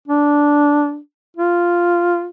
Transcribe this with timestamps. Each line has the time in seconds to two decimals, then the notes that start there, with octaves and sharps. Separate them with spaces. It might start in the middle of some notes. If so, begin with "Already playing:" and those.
0.08 D4
1.37 F4